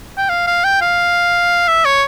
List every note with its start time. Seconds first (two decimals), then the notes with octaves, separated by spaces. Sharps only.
0.18 G5
0.29 F5
0.47 F5
0.64 G5
0.81 F5
1.67 E5
1.85 C#5